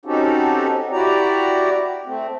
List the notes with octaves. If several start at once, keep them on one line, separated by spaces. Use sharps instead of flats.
C4 C#4 D#4 F#4 G4 A4
E4 F#4 G4 D5 A#5
A3 C4